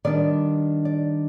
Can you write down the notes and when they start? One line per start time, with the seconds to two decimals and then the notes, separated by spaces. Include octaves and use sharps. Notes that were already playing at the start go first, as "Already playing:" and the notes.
0.05 D#3 G3 B3 D4 D5
0.85 D5